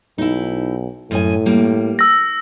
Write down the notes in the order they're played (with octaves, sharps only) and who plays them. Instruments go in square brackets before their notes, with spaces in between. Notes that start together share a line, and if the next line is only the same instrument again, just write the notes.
[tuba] B1 [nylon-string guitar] D#4 E4
[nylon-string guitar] F#2 D#5 G#5 [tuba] A2
[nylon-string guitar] G3 A#3
[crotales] E6 A#6